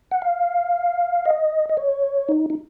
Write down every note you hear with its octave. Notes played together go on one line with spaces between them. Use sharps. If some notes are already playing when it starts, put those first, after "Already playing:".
F#5
F5
D#5
D#5
C#5
D#4
D#4